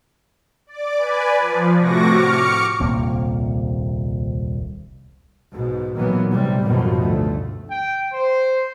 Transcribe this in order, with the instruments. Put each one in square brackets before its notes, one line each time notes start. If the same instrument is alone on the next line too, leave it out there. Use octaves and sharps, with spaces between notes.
[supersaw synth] D5 D6
B4 D5 G#5
F3
A2 C3 F#4 C#6 D6 A#6
C#6 D6 F6 C#7
[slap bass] D#1 C2 A#3 C4
[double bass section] B1 G#2 B2
A#2 D#3 E3 F#3 A#3 B3
A2 C3 G3
A1 F#2 B2 D#3 F3 F#3
G1 D2 A3
[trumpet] G5
C5